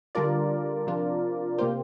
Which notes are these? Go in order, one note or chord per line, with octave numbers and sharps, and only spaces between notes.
D3 G3 D4 F4 A#4 D5
C3 F3 D4 F4
C3 A#3 F4 G4 C5